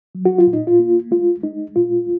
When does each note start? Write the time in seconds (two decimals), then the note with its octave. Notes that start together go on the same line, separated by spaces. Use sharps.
0.15 F#3
0.25 F#4
0.38 F4
0.47 A#2
0.53 D#4
0.67 F4
0.80 A#3
1.11 G#3 F4
1.44 G#3 D#4
1.76 A#2 F4